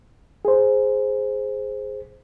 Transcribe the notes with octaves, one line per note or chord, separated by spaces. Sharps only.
G#4 C5